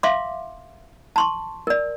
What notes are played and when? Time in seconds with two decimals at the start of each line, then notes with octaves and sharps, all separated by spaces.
0.03 E5 F5 C6 D6
1.16 A5 C6 C#6
1.67 A#4 D5